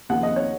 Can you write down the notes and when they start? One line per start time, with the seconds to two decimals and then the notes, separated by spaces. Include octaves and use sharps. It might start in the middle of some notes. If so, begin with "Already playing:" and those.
0.09 D#2 C#3 F3 F#5
0.23 D#5
0.36 C#5